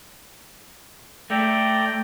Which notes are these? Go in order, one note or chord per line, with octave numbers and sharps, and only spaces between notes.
A3 D5 G5 A#5